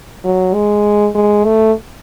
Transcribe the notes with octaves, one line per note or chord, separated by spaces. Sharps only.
F#3
G#3
G#3
A3